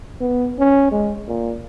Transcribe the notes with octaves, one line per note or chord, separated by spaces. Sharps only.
B3
C#4
G#3
A#2